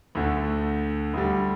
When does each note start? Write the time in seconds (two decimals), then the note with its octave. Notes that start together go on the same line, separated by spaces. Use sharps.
0.15 D2 D3 A3
1.14 D2 D3 G3